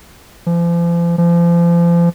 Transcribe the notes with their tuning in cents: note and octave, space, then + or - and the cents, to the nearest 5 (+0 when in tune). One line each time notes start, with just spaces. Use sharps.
F3 -40
F3 -35